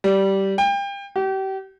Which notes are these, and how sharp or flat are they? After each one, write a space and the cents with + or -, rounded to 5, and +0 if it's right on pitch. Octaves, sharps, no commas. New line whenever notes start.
G3 -15
G5 +30
G4 -35